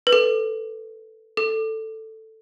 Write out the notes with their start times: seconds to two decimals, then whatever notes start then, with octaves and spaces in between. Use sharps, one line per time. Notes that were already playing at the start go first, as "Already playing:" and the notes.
0.07 B4
0.12 A4
1.37 A4